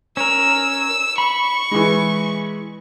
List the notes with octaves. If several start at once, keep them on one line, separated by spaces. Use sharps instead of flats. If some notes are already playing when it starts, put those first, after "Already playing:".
C#4 A#4 E6
B5 C#6
E3 G#3